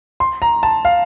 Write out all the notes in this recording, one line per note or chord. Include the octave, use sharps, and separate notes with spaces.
C6
A#5
A5
F5